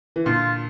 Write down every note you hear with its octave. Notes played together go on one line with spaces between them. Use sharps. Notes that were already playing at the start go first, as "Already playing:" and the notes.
E3
A#2 D3 F4